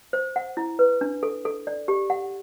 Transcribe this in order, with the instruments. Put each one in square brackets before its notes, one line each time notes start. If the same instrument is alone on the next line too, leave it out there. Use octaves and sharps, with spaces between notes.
[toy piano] C5
F#5
E4
B4
D4
A4
A4
D5
G4
F#5